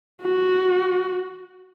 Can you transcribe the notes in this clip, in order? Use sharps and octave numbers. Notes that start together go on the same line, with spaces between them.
F#4